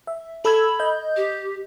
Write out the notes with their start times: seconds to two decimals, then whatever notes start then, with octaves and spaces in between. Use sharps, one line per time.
0.07 E5
0.45 A4 B5 E6 G#6
0.79 D#5 G6
1.16 G4